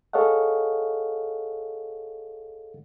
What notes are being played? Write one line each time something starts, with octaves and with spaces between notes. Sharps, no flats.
G#4 A4 C#5 D#5 F5 F#5